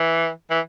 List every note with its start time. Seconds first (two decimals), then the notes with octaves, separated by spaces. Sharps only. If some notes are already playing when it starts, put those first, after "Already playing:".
Already playing: E3
0.51 E3